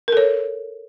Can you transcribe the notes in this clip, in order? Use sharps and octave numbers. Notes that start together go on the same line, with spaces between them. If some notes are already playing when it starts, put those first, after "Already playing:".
A4 A#4 C#5